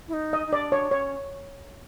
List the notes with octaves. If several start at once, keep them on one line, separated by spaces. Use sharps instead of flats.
E4
D#4
D#5
D#4
D4 D5
C#5
C#4 C#5